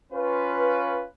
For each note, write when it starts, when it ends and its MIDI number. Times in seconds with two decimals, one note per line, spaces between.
0.13 1.05 61
0.13 1.05 65
0.13 1.05 71